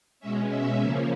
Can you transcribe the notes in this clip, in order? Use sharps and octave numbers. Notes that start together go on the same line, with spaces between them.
B2 G#3 C#4 E5
E5
C#3 F3 A#3 C#4 E5